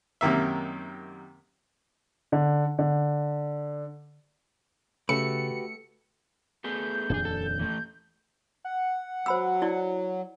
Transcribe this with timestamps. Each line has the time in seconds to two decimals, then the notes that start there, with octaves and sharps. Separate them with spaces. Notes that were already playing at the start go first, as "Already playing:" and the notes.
0.21 F#2 C3 D#3 A#3 E5
2.32 D3
2.79 D3
5.09 C#3 A3 F#4 G4 B4 C#7
6.64 A3 B3 G#4 G6
7.10 D#1 F2 D4 G#4 A4
7.25 A4
7.59 E3 A3
8.65 F#5
9.26 F#3 C5 B5 E6
9.62 E4 D5